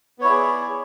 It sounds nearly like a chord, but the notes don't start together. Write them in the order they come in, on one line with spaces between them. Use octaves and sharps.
B3 C#5 E4 D5 G#4